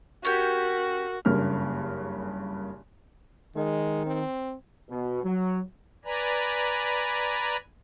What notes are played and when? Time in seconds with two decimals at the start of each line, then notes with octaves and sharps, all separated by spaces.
0.25 C#4 F#4 G4 A#4
1.25 F#1 G2 C#3 A#3 F6
3.56 D#3 G#3
4.06 C4
4.89 B2
5.24 F#3
6.05 B4 D5 G#5 A#5 B5